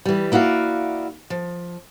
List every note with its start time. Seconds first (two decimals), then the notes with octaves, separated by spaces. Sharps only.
0.05 E3 G3
0.32 A#3 E4 F#4 D5 F5
1.30 F3